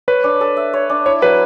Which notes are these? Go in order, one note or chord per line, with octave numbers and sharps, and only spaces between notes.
B4 C#5
D4
A4
E5
C#5
D4
E4 C#5
F#3 B4